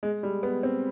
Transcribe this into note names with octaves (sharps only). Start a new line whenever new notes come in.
G#3
G3
B3
C4